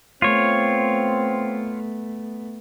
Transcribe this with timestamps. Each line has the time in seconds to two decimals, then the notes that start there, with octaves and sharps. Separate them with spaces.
0.22 A3 B3 C4 F4 C#5